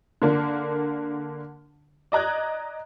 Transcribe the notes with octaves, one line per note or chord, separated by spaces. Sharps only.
D3 A#3 D4
D5 D#5 A#5 F#6 G#6